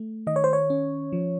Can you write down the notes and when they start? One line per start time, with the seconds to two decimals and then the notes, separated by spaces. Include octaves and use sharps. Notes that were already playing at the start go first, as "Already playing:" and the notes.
Already playing: A3
0.27 D#3 D#5
0.36 C#5
0.44 C5
0.53 C#5
0.70 C#4
1.13 F3